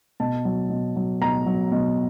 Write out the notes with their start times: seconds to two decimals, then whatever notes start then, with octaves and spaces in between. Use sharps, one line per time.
0.20 B2 A5
0.45 F#3
0.70 B2
0.96 F#3
1.21 B2 A#5
1.46 F#3
1.72 B2